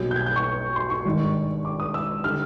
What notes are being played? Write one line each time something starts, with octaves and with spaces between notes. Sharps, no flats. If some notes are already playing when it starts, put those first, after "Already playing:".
Already playing: B1 B2 G3 A#3 G6
G6
G#6
G6
C#6
C6
C#6
G#1 G2 D#3 G#3
D6
D#6
E6
D3 G3 F6